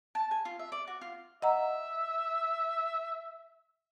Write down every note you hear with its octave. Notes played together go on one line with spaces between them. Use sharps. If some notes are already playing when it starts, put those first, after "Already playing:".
A5
G#5
F4
E5
D5
F#4
F4
D#5 E5 F#5 A#5